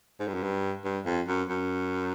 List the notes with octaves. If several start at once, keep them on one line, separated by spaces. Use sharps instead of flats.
G#2
G2
F#2
G2
G2
F2
F#2
F#2